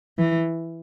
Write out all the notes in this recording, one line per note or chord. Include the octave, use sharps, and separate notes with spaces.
E3